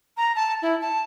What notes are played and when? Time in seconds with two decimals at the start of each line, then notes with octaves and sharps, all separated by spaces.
0.17 A#5
0.36 A5
0.62 E4
0.81 A5